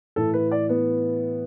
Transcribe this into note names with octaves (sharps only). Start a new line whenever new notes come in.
A2 E3 A4
B4
D5
B3